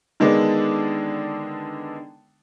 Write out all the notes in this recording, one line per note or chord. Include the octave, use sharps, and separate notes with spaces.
D3 D#3 G#3 B3 D4